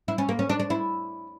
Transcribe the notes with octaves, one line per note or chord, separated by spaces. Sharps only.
E4
C#4
A#3
C#4
D4
D4
E4